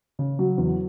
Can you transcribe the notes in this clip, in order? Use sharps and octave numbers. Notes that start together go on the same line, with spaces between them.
C#3
F#3
E2